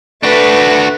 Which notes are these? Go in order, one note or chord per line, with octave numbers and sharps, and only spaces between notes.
A3 D4 F#4 B4